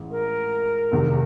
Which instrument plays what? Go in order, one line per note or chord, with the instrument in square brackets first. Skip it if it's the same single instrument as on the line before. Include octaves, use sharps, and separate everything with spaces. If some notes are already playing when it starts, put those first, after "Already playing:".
Already playing: [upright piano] A1 G#2 E3
[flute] A#4
[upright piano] F1 E2 C3 D#3